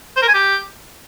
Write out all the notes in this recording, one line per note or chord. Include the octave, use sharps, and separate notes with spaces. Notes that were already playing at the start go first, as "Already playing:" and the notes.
C5
A#4
G#5
G4